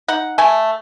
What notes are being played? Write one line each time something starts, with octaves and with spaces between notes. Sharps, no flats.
D#4 F#5
A3 G#5